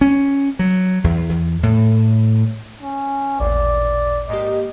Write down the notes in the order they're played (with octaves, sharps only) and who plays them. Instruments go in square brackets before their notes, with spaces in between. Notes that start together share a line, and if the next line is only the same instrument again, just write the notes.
[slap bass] C#4
F#3
E2
E2
A2
[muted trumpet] C#4
[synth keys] A1 D#2 A#2 [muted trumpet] D5
[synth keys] G#2 A#3 G4 [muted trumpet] D#5